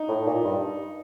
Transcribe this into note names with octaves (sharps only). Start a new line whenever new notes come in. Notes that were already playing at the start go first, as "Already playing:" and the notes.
Already playing: D#4
A2
A#2
G2